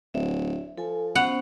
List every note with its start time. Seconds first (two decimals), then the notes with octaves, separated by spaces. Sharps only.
0.14 D1 E5
0.78 F3 A4 G#5
1.15 B3 C#4 C5 F#5